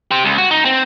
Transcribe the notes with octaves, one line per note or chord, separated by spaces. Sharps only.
G4 C5
C#2
F#4
D#4
C4